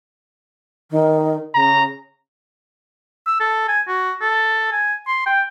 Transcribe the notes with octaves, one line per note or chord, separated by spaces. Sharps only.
D#3
C#3 A#5
E6
A4
G#5
F#4
A4
G#5
C6
G5